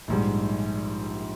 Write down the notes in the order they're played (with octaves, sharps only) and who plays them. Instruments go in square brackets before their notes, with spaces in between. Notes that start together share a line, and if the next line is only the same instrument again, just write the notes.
[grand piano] A#1 G#2 G3